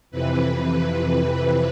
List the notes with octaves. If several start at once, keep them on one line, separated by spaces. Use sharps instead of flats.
F2 C3 E3 B4
B4